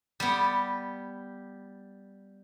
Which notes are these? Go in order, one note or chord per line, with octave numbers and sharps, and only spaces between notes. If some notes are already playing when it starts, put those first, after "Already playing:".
G3 B3